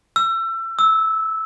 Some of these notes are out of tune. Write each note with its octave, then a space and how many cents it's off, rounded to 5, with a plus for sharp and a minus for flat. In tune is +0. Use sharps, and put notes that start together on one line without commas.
E6 +30
E6 -15